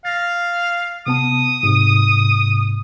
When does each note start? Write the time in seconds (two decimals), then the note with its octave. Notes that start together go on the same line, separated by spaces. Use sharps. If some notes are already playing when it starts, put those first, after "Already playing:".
0.05 F5 A6 A#6
1.07 C3 B3 A5 D#6
1.63 G#2 C3